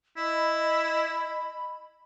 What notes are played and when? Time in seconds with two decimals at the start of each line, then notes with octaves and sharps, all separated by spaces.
0.17 E4 D#5 B5